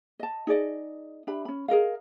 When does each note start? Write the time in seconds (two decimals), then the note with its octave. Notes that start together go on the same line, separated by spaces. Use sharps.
0.19 D#5 A5
0.47 D#4 G#4 D5 D#5
1.27 D4 G4 E5 B5
1.45 C#4 B5
1.68 G#4 A#4 D#5 F5